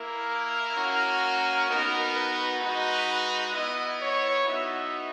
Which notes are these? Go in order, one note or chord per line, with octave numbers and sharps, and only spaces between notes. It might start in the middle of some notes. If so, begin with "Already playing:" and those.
Already playing: A#3 E4 A#4
A#3 C#4 F#4
B3 D#4 F#4 A#4
B4
G#3 D#4 F#4
B3 E4 D#5
C#5
B3 D#4 F#4 E5